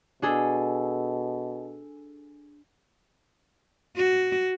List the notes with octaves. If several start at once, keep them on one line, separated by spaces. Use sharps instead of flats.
B2 D4 G#4 A4
F#4